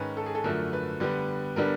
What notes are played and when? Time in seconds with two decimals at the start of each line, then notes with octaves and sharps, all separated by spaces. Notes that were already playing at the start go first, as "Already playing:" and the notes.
Already playing: G#2 D#3 G#3 C#4 B4
0.17 A4
0.26 G#4
0.35 A4
0.44 F#2 D3 F3 A3 A#4
0.73 B4
1.00 D3 G3 B3
1.56 D3 G3 B3 D4 A#4